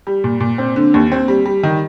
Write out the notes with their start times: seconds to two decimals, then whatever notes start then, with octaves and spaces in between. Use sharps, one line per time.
0.07 G3
0.24 A#2
0.40 A#2
0.58 C4
0.76 D3
0.94 D#2
1.12 C4
1.28 G3
1.46 G3
1.63 D#3